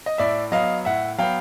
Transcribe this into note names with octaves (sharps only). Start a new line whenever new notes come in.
D#5
A2 D5 E5
F#3 B3 D#5 F5
A2 E5 F#5
F#3 B3 F5 G5